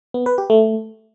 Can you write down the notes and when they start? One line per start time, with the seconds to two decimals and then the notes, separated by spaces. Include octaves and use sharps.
0.14 B3
0.26 B4
0.38 G4
0.50 A3